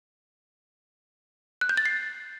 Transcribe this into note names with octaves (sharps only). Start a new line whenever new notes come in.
F#6
G6
A6
C7